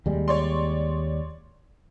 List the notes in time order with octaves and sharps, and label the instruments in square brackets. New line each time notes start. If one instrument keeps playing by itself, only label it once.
[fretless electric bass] D#2 G3 G#3
[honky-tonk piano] C#5 D5 C6